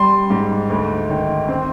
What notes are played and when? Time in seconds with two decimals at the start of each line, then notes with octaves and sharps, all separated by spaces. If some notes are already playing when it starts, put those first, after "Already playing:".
Already playing: G3 C6
0.30 G#2
0.70 D2
1.10 D#3
1.49 C4